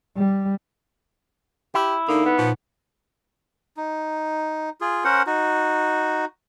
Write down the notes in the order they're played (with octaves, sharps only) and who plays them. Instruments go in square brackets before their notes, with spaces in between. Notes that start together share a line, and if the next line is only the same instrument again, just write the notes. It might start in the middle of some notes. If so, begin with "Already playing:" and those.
[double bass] G3
[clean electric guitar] E4 [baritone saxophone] G4
[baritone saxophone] D3 [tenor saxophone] A#3 [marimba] D#4
[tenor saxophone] B3
[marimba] A#2 [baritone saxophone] F3
[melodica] D#4
F4 G#4
C#4 A#4 C5 F#5
D#4 F#4